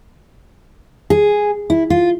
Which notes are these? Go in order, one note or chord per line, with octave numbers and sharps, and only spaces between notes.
G#4
E4
F4